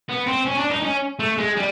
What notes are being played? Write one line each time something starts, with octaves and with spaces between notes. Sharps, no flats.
B3
C4
C#4
D4
D#4
C#4
A3
G#3
G3